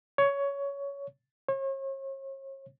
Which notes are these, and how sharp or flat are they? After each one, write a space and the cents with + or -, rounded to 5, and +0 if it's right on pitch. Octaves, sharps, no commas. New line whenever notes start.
C#5 +15
C#5 -40